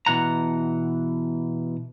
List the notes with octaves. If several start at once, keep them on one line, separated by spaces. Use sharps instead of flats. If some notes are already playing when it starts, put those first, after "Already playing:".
B2 E3 F#5 A#5